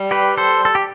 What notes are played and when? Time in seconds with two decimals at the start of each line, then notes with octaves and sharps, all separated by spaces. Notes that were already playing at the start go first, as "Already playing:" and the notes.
Already playing: G3
0.11 G4 B4
0.37 A4 C5
0.65 A4
0.75 G4